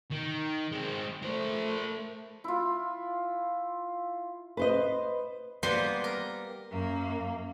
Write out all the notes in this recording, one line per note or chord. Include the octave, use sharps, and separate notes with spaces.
D#3
G#3 C4
A3 A#4 C5
E4 F4
B4 C5 D#5
G3 A#3 B3 C5 F#5 C6
A#4
F#2 A#3